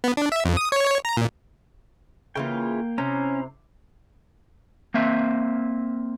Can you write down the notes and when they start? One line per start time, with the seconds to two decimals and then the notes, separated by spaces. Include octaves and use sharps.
0.04 B3
0.17 D4
0.32 E5
0.45 F2
0.57 D#6
0.72 C#5
0.87 C#5
1.05 A#5
1.17 A#2
2.35 C#3 E3 A#3 F4 F5 G5
2.98 C3 C#4 E4 C5 A#5
4.94 A#3 C4 E5